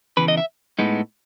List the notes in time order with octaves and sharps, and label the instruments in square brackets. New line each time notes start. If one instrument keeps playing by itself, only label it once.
[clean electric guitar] E2 C#3 E3 B4
D#5
E5
A2 G#3 B3 D#4